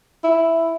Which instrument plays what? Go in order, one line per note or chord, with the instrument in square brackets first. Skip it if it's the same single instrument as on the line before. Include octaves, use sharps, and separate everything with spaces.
[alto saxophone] E4